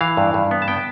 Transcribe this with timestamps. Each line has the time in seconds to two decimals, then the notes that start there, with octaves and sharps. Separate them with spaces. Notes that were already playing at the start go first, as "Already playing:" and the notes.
0.01 E3 F5
0.17 G2
0.34 G2
0.51 B3
0.62 A5
0.68 B3 G5